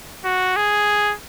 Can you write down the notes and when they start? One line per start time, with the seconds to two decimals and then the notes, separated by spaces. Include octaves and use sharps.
0.25 F#4
0.56 G#4